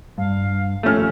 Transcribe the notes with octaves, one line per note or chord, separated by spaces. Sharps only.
G2 F5
D#2 F3 A3 C#4 F6